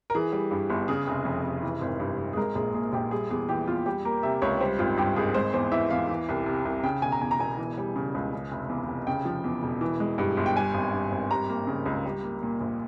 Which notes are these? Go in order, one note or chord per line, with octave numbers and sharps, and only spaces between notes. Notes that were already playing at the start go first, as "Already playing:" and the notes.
A#4
E3 G#4
G3
G2
G1
C#3 G#4
F1
F2
F1
E3
G#1
G2
G#1
G#4
G#3 A#4
A#1 G#4
A#2 G#4
A#1 G4
G3 G#4
E2 G#4
E3 G4
E2 F4
G3 G4
A#3 A#4
C3 E5
C#2 C#5
G3 C5
G#1 F4
G2 G4
G#1 G#4
G#3 C5
E2 C5
E3 E5
E2 F5
E3
C2
C3
C2
C#3 G5
E1 G#5
A#5
E2 G#5
A#5
E1 G#5
E3
G3
C#3
C#2
C#3
F1
E2
F1
C#3 G5
F3
E2
E1
E3
G#3
G2
G1
G5
G3 G#5
G#1
G2
G#1
G3 A#5
A#3
C#3
C#2
G3
A#3
A#2
A#1